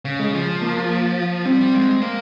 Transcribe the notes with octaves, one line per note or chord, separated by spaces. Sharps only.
C#3
G#3
F3
A#3
G3 C4
G#3
A#3